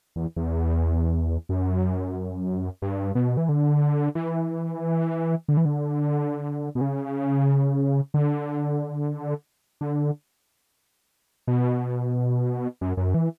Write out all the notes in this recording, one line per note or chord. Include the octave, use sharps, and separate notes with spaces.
E2
E2
F#2
G2
B2
E3
D3
E3
D3
E3
D3
B2
C#3
D3
D3
B2
F#2
F#2
E3